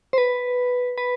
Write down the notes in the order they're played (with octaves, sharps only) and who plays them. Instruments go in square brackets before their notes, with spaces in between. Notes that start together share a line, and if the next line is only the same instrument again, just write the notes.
[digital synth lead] C5
B4
B4